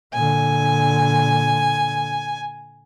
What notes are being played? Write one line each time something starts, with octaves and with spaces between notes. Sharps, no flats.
A#2 D3 G#5